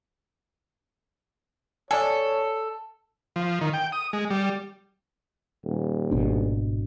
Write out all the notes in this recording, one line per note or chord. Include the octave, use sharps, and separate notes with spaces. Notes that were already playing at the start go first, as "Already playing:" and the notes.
A4 C#5 D5 G#5
F3
D#3
G5
D#6
G#3
G3
D#1
G#1 B2 D4